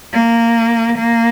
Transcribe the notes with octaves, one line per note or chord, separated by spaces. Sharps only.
A#3
A#3